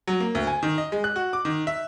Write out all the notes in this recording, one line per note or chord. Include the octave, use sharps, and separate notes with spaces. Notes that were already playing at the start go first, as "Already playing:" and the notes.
F#3
A#3
D2
G#5
D#3
D#5
G#3
F#6
F#4
D6
D#3
E5